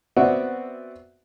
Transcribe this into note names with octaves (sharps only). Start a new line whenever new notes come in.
B3 C4 F#4 D5 E5 F#5